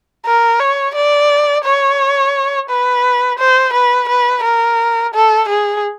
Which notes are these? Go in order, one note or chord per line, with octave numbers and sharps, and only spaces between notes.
A#4
C#5
D5
C#5
B4
C5
B4
B4
A#4
A4
G#4